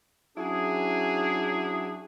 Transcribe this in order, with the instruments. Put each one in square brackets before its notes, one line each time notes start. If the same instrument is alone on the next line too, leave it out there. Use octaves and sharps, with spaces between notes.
[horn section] F#3 C#4 D4 E4 G#4